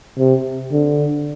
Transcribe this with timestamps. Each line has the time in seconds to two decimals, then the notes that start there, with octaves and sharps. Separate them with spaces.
0.18 C3
0.72 D3